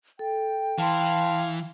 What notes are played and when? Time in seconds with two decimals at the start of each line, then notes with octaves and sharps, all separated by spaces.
0.19 A4 G5
0.79 E3 F5 A5 C6